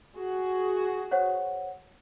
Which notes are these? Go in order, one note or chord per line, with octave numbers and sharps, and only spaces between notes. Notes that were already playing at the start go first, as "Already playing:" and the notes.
F#4 G#4
C5 C#5 F#5